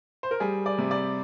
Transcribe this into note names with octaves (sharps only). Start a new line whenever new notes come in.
C5
A#4
G3 G#4
D5
C3
D5